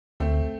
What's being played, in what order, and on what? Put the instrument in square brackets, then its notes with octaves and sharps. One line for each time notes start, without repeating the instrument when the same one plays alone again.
[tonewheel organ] D2 [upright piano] A3 C4